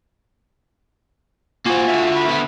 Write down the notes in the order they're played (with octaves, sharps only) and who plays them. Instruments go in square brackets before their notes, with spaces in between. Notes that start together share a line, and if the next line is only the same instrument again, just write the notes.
[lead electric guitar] A#3 C5 [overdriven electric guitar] F4 F#4 [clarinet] G#5
[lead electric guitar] D3 E5
[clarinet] B5
[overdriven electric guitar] B3